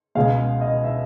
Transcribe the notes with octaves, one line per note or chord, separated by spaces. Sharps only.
C#2 B2 G#3 F5
D#5
E5